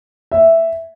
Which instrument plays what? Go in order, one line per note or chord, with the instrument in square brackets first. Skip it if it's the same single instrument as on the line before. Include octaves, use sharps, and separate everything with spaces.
[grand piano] E5